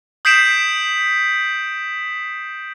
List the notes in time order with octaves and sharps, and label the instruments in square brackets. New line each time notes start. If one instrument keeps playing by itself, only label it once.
[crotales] D#6 G6 B6 C7 D7 E7